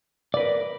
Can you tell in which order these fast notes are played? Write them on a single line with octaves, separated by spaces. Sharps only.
D5 B4 A#4